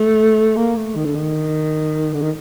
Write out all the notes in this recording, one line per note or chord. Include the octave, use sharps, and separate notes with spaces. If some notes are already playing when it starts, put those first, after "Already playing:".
Already playing: A3
A#3
A3
D#3
D3
D#3
D3
D#3